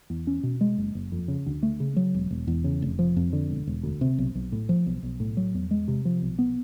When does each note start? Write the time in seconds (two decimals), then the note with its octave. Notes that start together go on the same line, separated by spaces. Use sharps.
0.10 E2
0.27 C#4
0.43 B2
0.61 G#3
0.78 F#1
0.95 F#1
1.12 F2
1.28 C#3
1.46 D2
1.63 A3
1.80 C#3
1.96 F#3
2.14 E1
2.31 E1
2.47 E2
2.64 C#3
2.82 F1
2.99 F3
3.16 F2
3.33 D3
3.50 E1
3.67 E1
3.83 D2
4.01 C3
4.18 B1
4.35 B1
4.52 A2
4.69 F3
4.86 B1
5.03 B1
5.20 A2
5.37 F#3
5.54 E2
5.71 G#3
5.88 C3
6.05 F3
6.22 B1
6.39 B3